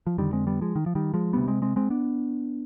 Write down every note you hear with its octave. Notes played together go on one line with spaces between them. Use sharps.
F3
F2 D3 D#3 G3
G#3 C4
G3 B3
F3 G#3
D#3
F3
D#3 G3
F3 G#3
D2 C3 G3 B3
G#3 C4
G#3 C4
G#3 C4
B3 D4